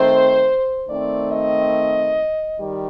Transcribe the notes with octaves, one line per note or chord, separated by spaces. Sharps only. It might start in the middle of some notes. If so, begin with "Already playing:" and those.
Already playing: D#3 A3 C4 C5
D#3 A3 C4 D5
D#5
D#3 G3